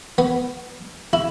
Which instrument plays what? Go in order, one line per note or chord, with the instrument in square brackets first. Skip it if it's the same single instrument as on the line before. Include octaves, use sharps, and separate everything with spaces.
[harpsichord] B3
E4